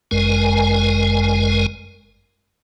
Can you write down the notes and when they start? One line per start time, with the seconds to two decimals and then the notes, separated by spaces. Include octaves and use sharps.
0.11 G1 F#2 G#3 A#4 G#5